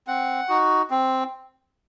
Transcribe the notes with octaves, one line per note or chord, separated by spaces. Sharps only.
C4 F#5
D#4 F#4
C4